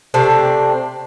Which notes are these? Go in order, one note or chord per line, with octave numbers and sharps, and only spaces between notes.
C3 A3 C4 D4